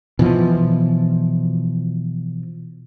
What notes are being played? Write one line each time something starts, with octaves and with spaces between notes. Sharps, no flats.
B2 E3 F3